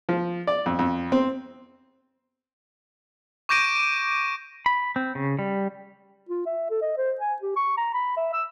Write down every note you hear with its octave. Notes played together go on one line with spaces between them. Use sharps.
F3
D5
F2
F2
C4
C#6 D6 G6 A#6 D7 D#7
B5
C4
C#3
G3
F4
E5
A4
D#5
C5
G#5
G4
C#6
A#5
B5
E5
E6